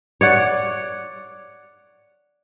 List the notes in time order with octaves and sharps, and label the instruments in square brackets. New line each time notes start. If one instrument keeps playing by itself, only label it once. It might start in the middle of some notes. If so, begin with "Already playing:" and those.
[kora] C#5 D5 F#5